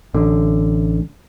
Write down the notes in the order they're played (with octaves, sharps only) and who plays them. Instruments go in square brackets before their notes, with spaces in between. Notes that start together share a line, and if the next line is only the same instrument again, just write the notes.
[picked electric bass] A1 D3